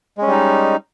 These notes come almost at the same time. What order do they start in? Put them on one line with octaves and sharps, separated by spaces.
G#3 C#4 G3 D#4